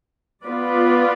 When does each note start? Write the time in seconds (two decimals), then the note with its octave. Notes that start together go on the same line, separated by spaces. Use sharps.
0.45 B3 F4 B4 D5